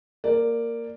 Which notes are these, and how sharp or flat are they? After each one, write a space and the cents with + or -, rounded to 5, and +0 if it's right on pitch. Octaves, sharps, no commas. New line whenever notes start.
A#3 -10 D5 +0